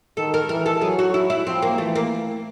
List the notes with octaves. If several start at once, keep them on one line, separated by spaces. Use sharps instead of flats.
D#3 A4
A#4
E3 A#4
A4
F#3 G#4
F#4
E4
E4
F3 C4
A#3
E3 A3
A#3